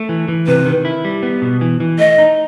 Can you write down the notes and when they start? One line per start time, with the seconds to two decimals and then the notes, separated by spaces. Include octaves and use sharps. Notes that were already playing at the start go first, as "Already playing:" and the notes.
Already playing: A3
0.09 E3
0.28 E3
0.47 C3 B4
0.66 D#3
0.85 E4
1.05 G3
1.23 B3
1.42 B2
1.61 E3
1.80 E3
1.99 A3 D#5
2.18 D#4